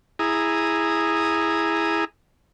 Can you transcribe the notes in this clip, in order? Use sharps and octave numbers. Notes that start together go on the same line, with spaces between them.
E4 G#4 A#5 D#6